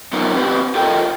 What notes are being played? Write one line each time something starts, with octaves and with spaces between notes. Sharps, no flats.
F#3 B3 D#4 F4 A#4
C4 G4 B4
F4 A4 A#4 D#5 G5